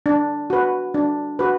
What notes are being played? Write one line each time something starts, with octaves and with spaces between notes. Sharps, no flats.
D4
F#4 B4
D4
F#4 B4